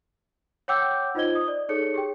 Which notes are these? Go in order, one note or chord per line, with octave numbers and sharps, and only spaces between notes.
C#5 F#5 G5 D6 E6 G6
D#4 F4 C5 D#5 G#6 G7
D#6
D5
D#4 G#4 A4 C#5 C#7
G4 G#4 G5